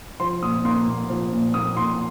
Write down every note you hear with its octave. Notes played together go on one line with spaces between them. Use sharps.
F3 C6
A#2 D#6
A#3 C6
A#2
F3
A#2
A#3 D#6
A#2 C6